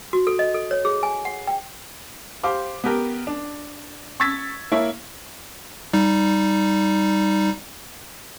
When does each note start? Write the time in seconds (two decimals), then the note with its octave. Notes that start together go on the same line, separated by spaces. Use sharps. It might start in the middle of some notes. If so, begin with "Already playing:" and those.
0.13 F#4
0.27 A4
0.39 D#5
0.54 A4
0.71 C#5
0.85 G#4
1.03 G#5
1.25 F#5
1.47 G5
2.43 G4 C5 F5 D6
2.84 B3 G4 A#4
3.27 D4
4.20 C#6 E6 G#6 A6 B6
4.72 A#3 E4 A#4 C#5 E5
5.94 G3 D#4